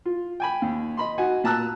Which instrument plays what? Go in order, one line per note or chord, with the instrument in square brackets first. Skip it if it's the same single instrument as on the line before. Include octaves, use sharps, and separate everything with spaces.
[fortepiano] F4
G5 G#5 B5
D#2
D#5 B5 C6
D#4 F#4 F#5 G#5
A#2 A5 A#5 E6 F#6